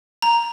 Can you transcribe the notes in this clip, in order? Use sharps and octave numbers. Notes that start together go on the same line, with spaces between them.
A#5